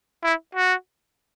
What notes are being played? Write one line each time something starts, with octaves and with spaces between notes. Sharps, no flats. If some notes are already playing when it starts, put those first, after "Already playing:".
E4
F#4